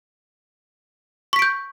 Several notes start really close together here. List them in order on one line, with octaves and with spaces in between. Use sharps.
C#6 B6 D7 G6